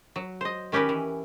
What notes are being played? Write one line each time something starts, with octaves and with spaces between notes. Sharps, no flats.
F#3
C5 D#5
D#3 C#4 G4 A#4 B4
E3